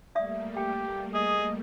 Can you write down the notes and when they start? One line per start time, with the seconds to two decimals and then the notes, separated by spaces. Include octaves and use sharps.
0.15 G3 A3 A#3 D5 E5 D#6
0.57 G4 G5
1.14 G#4 D#5